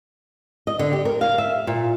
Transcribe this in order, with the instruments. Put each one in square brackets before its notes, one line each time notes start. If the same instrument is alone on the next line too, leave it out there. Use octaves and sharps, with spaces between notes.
[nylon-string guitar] D#5
D3
G4
A#4
F5
E5
A#2